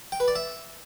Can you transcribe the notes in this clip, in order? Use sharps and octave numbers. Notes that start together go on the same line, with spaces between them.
G5
B4
D5
E5